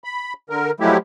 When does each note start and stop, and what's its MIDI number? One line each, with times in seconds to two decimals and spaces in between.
0.04 0.33 83
0.50 0.71 50
0.50 0.71 70
0.80 0.97 53
0.80 0.97 54
0.80 0.97 56
0.80 0.97 57
0.80 0.97 64
0.80 0.97 67